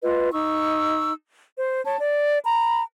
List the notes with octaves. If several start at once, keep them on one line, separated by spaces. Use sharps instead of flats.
F4 B4 D#5
D#4 C#6 E6
C5
C#5 A5
D5
A#5 B5